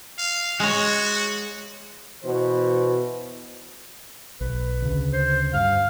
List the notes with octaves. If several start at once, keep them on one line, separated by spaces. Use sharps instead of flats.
F5
G#3 F#4 C#5
B2 E3 C5
B1 B4
D2 C#3
C5
G2 F5